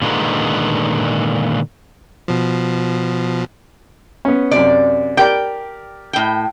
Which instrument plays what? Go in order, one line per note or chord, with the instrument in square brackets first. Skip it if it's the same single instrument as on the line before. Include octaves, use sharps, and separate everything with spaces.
[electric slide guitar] A#2 D3 D#3 G#3 A3 B3
[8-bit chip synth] B2 F3
[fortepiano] B3 C#4
[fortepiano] F#2 C3 [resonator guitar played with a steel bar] D5
[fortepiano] G4 A#4 D5 [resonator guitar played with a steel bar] G5
[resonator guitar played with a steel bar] A2 G5